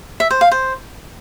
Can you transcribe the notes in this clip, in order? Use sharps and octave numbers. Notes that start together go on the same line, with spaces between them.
E5
C5
F5
C5